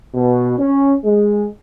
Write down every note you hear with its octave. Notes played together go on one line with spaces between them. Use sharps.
B2
C#4
G#3